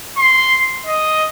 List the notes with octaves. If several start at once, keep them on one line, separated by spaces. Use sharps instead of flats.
C6
D#5